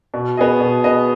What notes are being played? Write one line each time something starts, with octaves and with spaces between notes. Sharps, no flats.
B2
B3 G#4 D#5
B2
B3 G#4 D#5